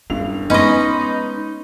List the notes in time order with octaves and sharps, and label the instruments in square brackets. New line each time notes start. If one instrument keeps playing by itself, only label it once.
[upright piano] E1 G2 F7 [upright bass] C#4
[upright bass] G#3 B3 [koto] C#4 D#5 [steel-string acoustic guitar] D#4 [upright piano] B4 B5 C6